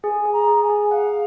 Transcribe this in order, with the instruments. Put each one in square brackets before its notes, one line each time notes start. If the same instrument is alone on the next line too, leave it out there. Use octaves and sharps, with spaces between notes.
[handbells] G#4 [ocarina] G#5
[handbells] G#4
[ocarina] A#5
[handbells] G#4
[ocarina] G#5
[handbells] G#4
[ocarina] F5 [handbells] F#5